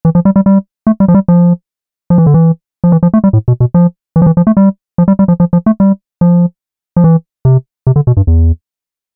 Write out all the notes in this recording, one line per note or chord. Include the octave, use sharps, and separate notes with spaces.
E3
F3
G3
G3
G3
A3
G3
F3
G3
F3
F3
E3
D3
E3
F3
E3
F3
A3
G3
A2
B2
B2
F3
E3
F3
E3
F3
A3
G3
F3
G3
G3
F3
F3
F3
A3
G3
F3
F3
E3
C3
C3
D3
B2
G2
E2